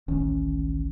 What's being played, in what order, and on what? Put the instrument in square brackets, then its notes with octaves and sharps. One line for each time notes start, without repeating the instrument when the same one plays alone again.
[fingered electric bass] D1 A1 D#3 C#4